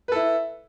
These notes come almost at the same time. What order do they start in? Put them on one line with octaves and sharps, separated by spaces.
B4 A4 E4